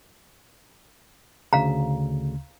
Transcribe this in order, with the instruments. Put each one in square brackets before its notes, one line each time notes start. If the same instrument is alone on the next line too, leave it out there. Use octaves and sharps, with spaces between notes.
[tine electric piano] D2 C#3 [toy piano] F5 A#5